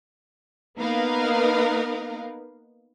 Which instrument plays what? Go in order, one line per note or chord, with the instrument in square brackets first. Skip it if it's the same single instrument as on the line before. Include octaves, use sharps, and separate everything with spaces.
[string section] A#3 B3 D#4 A#4 B4 F5